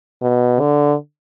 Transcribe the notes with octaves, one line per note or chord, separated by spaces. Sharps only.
B2
D3